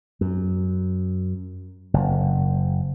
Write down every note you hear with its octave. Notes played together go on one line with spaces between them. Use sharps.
F#2
F#1